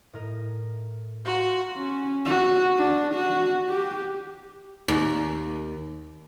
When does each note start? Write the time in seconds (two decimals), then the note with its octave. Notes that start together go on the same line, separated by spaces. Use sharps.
0.13 A2 A#4 D#5
1.25 F#4 F5 A#5 C6
1.77 C#4
2.25 F#4
2.77 D4
3.14 F#4
3.69 G4
4.88 D#2